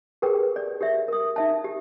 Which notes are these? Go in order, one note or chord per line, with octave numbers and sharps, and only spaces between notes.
G4 G#4 A#4 B4 G5
D5
G4 A#4 D5 E5
A#4 D#6
D#4 E5 A5
G4